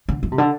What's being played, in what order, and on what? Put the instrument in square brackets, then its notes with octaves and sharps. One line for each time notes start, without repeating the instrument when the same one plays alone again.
[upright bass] D3
F3
C3
D3